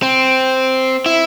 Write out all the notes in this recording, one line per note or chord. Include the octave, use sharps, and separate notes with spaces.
C4
E4